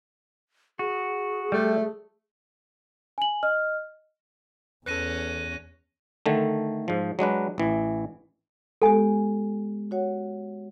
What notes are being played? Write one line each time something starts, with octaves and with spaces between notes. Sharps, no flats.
F#4 G#4
G3 A3
G#5 F#7
D#5 F6
E2 C#4 A4 B4 F#6 A#6 D#7
D3 D#3 A3
G#2 F3
F#3 G#3 D4 B4
A1 E3
G#3 B3 G4 A4 G#5
F#4 C#5 F#5